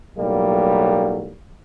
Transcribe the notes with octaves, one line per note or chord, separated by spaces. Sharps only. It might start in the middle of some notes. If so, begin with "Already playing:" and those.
B1 A2 F#3 G3 A#3